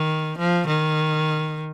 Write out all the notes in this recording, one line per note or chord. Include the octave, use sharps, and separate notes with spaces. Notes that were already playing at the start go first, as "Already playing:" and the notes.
Already playing: D#3
F3
D#3